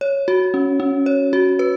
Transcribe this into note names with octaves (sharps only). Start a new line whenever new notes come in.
C#5
F#4
C#4
C#4
C#5
F#4
B4